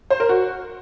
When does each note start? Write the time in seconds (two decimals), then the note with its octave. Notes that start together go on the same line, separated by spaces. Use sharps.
0.10 C5
0.20 A#4
0.29 F#4